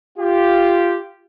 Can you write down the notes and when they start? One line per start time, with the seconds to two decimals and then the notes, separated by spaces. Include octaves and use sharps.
0.19 F4 G4